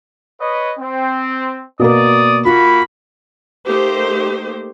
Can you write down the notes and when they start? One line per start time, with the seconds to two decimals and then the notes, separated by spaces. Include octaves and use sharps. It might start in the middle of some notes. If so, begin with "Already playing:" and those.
0.40 B4 C#5 D#5
0.79 C4
1.80 B2 A#3 A#4 D5 D#6
2.45 A#3 F4 F#4 B5
3.67 A3 A#3 D#4 G4 C5